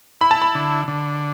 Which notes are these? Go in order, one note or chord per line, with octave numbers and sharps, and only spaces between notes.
E4 B5
A5
B5
D3
D3